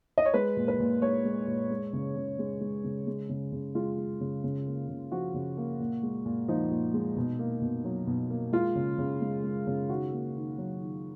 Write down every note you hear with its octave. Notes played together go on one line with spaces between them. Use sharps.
D#5
C#5
G#3 B4
A#2
B4
A#2
G#3 C#5
G#3
A#2
G#3
C#3
C#3
G#3
G#3
C#3
G#3
C#3
C#3
G#3 F4
G#3
C#3
C#3
A#3
C#3
F3 F#4
C#3
A#3
A#2
G#3
A#2
F3 D#4
A#2
G#3
B2
A#3
B2
F#3
B2
A#3
G#3 F4
C#3
C#3
G#3
G#3
C#3
D#3 F#4
A#3
D#3
F#3
D#3